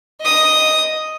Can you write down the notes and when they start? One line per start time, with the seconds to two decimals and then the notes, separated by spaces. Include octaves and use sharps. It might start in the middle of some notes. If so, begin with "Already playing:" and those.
0.21 D#5 D#6